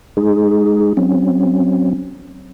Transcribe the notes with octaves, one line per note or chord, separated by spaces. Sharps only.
G#3 D#4 G#4
F#3 C4 C#4